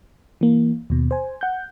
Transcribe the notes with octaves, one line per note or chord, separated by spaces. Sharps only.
E3 A#3
D#2 B2
C5 G#5
F#5 G6